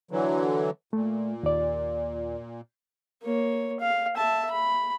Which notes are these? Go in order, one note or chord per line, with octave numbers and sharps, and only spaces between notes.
D3 E3 F#3
A#2 A3
D#2 D5
A#3 C#5
F5
E5 A5
B5